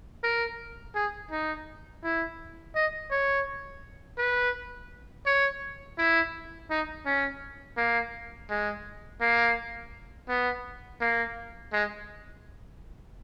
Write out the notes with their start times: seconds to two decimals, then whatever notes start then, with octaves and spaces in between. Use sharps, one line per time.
0.23 A#4
0.95 G#4
1.31 D#4
2.03 E4
2.75 D#5
3.11 C#5
4.18 B4
5.26 C#5
5.98 E4
6.70 D#4
7.06 C#4
7.77 A#3
8.50 G#3
9.21 A#3
10.28 B3
11.01 A#3
11.73 G#3